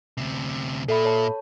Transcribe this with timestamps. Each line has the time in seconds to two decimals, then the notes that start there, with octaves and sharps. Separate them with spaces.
0.17 D2 C3
0.88 A#2 A4 E5 B5
1.05 C#5 A5